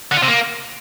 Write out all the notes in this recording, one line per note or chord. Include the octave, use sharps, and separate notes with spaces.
D3
F4
C3
A#3